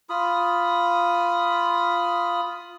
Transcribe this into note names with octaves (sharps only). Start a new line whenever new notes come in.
F4 B5 D#6